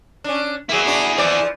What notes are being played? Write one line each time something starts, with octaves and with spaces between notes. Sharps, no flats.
C#4 D4
F#3 A#3 E4 G#4
D4 F#4
E3 F3 D5